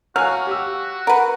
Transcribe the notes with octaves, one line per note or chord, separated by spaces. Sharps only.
F#3 F#4 F5 G#5 F6
G4 E6
A#4 B4 F#5